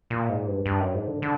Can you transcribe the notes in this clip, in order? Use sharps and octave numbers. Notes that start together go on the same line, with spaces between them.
A#2
G#2
G2
G2
F#2
G#2
D3
D3